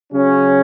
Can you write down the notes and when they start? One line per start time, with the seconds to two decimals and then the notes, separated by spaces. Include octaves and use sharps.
0.12 C#3 F#3 C#4